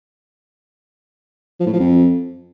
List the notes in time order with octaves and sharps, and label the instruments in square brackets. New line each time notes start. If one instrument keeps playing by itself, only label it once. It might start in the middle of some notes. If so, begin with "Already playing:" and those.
[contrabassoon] F3
A2
F3
F2